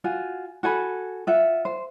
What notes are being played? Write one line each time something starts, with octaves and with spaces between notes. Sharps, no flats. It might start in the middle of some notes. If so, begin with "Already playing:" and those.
F4 F#4 G#5
F#4 A4 G#5 B5
F4 E5 F#5
C5